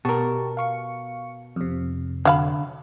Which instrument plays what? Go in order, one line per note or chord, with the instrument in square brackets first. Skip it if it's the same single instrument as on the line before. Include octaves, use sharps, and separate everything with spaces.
[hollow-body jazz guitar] B2 A#4 [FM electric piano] G4 A5 C#6
[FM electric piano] F5 C#6 C#7
F2 C3
[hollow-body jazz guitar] D3 [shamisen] F#3 F5 B5